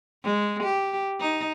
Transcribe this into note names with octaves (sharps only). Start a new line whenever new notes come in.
G#3
G4
D#4